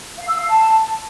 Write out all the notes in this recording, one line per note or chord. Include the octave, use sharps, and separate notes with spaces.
F5
E6
F5
A5